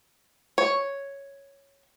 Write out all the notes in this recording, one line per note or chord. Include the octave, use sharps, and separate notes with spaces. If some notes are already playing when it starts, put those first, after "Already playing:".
C#5